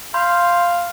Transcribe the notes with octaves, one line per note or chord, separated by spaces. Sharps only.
F5 B5 C6 G6